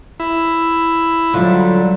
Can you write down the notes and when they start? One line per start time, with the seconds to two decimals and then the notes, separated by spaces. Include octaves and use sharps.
0.20 E4
1.34 D3 F#3 G3 F4